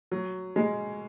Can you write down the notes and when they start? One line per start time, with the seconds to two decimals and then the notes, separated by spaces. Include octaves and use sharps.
0.12 F#3
0.56 G#3